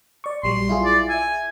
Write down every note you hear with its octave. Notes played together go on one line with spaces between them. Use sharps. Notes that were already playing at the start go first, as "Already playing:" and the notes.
D5 C#6
A#1 F#3 G3 C6
E4 F4 G#4
D5
E5 G#5